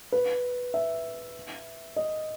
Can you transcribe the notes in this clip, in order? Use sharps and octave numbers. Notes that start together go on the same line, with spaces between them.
B4
E5
D#5